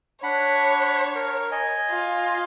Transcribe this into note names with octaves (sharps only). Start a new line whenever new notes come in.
D4 C#5 F#5 B5
A#4
D#5 G#5
F4